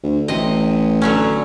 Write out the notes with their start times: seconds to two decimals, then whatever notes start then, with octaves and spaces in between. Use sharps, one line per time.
0.03 D2
0.28 A1 C3 D#5
1.02 D3 F#3 C#4